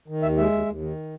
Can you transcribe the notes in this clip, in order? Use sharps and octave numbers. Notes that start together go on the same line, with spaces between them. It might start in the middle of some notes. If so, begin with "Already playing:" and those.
D#3
D#2 E5
G#3 E5
D#2
D#2
D#3